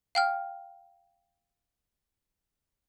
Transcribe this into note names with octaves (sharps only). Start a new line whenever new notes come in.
F5 G5 F6